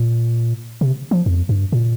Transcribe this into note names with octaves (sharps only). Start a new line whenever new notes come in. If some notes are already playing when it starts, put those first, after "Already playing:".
Already playing: A#2
C3
F3
F2
G2
A#2